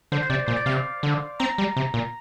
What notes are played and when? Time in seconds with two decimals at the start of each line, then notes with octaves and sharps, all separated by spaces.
0.12 D3 C5
0.23 C5
0.30 C3 D5
0.46 A#2 C5
0.56 D5
0.66 C3 F5
1.03 D3
1.40 C4 A#5
1.58 G3
1.77 C3
1.94 A#2